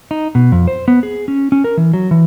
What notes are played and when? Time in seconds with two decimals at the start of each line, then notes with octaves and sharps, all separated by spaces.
0.11 D#4
0.35 B2
0.52 F2
0.68 C5
0.88 B3
1.03 G#4
1.28 C#4
1.52 C#4
1.64 A#4
1.77 E3
1.93 F#3
2.11 E3